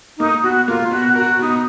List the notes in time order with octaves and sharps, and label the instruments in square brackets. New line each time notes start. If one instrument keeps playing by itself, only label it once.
[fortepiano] A#3 [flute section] D#4
[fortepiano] B2 [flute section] F#4
[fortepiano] A#3 [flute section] F4
[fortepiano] B2 [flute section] F#4
[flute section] F#4 [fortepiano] A#4
[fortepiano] B2 [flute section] D#4